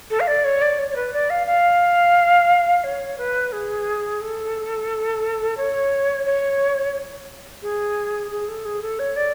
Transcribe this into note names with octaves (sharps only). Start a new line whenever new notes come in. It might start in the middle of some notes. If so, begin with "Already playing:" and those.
A4
F5
D5
C#5
D5
C#5
C#5
B4
D5
F5
F5
C#5
B4
G#4
A4
C#5
C#5
G#4
G#4
A4
G#4
A4
C#5
D5